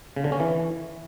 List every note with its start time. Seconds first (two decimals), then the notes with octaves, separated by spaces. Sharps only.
0.16 C#3
0.24 D3
0.32 C#4
0.40 E3